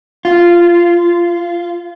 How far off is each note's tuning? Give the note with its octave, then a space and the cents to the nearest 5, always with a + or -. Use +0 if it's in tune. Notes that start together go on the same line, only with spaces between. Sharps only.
F4 -15